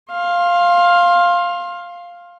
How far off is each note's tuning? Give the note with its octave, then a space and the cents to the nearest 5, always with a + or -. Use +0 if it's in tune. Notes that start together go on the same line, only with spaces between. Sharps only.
F5 +0 C6 +25